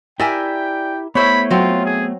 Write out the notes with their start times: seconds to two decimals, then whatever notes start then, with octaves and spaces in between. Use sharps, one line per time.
0.20 E4 G4 A#4 D5 E5 G5 G#5
1.15 A3 B3 E4 C5 C#5 B5
1.51 F#3 C4 F4
1.85 G#4